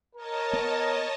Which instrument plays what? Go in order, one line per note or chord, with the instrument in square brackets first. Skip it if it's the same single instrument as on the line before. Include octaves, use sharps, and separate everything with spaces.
[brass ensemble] A#4 [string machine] C#5 D#5 A5
[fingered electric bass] B3